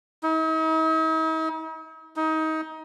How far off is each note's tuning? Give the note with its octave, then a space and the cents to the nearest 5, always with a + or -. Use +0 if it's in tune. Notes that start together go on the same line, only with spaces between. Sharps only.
D#4 +45
D#4 +25